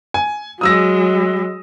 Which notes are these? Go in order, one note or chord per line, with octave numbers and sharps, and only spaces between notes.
G#5
F#3 G#3 D#6 E6 A#6